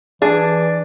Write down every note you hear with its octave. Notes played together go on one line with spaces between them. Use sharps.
E3 D4 G#4 D5